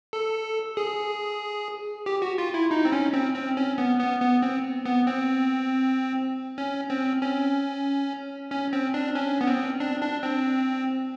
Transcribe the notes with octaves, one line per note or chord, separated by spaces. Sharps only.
A4
G#4
G4
F#4
F4
E4
D#4
C4
C#4
C4
C4
C#4
B3
B3
B3
C4
B3
C4
C#4
C4
C#4
C#4
C4
D4
C#4
B3
C4
D4
D4
C4